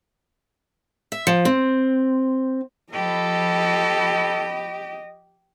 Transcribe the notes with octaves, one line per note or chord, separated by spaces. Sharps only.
E5
F3
C4
F3 G4 A4 D#5 B5